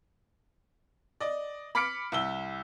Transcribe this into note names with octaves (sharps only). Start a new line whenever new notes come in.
D5 D#5
B5 D6 F6 B6 C#7 D7
C2 E6 G7